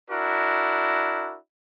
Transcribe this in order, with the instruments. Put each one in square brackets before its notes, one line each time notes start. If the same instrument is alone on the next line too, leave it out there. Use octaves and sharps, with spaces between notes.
[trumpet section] D4 E4 F#4 A#4